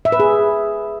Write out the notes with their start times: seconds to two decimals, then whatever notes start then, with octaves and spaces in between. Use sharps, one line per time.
0.05 E5
0.12 B4
0.20 G#4